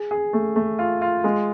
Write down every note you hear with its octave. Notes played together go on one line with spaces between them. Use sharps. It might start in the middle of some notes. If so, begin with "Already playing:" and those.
Already playing: G#4
G#4
A3
A3
F4
F4
G#3